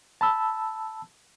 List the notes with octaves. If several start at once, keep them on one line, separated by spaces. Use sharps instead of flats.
A5 B5 E6